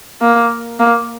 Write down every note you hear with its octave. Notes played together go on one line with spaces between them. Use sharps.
A#3
A#3